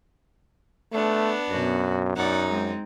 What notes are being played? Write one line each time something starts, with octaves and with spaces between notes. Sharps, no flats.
A3 B3 D4
F#2 B2 F#4
F#2 D#4 D5 F#5
G#3 C4